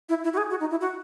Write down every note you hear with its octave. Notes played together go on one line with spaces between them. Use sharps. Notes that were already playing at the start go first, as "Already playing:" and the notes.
E4
E4
F#4
G#4
F#4
D#4
E4
F#4